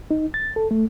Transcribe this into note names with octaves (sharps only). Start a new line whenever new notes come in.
D#4
A6
A4
A3